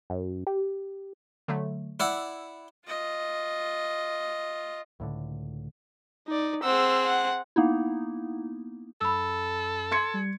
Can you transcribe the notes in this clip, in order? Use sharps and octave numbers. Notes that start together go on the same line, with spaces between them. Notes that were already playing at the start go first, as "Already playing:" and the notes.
F#2
G4
D3 F#3 A3
E4 D5 F#5 E6
F4 D#5
C#2 A2 D3
D#4 D5
C4 G#4 F#5 E6
F#5
A#3 B3 D#4 E4
F#2 A4 B5 E6
C6 G#6 C#7
G3